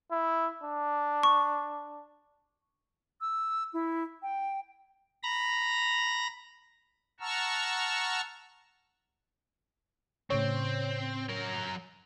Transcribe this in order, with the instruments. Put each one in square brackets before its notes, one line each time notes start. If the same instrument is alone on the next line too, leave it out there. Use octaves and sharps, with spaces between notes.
[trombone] E4
D4
[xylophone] C#6
[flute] E6
E4
G5
[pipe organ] A#5 B5 A#6
F#5 A5 A#5 C#6 E6 F6
[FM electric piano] A2 C#3 C#5 [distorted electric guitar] C4
[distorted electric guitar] F#3 A#4